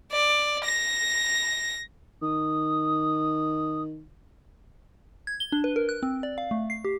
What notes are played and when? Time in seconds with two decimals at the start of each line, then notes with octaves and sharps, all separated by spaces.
0.12 D5
0.64 A#6
2.22 D#3 D#6
5.27 G#6
5.40 G7
5.52 D4
5.64 B4
5.76 A#4
5.89 F#6
6.03 C4
6.23 D5
6.38 F5
6.51 A3
6.70 C7
6.85 G4